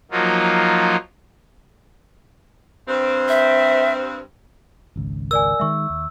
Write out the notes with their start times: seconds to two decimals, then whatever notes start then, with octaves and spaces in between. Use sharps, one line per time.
0.11 F3 F#3 A#3 D#4 F4
2.88 G2 C4
3.29 E5
4.96 G#1 C#2
5.31 A#4 D5 G#5 E6
5.59 D#3 G#3 E5 C#6
5.90 D#2